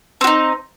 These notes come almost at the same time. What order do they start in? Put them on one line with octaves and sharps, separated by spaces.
C4 F#4 D#4